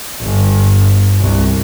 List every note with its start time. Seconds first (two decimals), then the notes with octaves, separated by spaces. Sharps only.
0.22 G1
1.20 C2